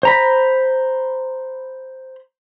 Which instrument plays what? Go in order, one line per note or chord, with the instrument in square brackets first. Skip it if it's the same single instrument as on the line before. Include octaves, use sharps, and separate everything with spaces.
[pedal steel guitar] C5 A#5 B5